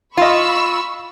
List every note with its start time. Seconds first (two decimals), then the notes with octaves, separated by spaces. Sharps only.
0.17 F4 D#5 F5 B5 C#6 E6